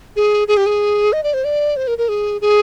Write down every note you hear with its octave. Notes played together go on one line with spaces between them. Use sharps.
G#4
G#4
G4
G#4
D#5
D5
C5
D5
C5
A#4
A#4
G#4
G#4